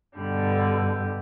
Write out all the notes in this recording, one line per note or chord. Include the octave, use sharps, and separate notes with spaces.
G2 B2 D3 G3